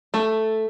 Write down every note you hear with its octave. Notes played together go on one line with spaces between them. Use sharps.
A3